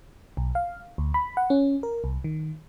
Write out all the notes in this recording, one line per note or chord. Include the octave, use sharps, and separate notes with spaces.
B1
F5
D2
B5
F#5
C#4
A#4
C2
D#3